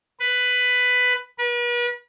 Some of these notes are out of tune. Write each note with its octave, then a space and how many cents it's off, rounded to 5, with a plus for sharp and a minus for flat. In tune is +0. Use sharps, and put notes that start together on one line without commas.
B4 +10
B4 -40